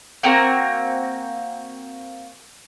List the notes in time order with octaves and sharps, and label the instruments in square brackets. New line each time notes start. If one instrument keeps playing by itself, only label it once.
[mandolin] A#3 C4 F#4 A#4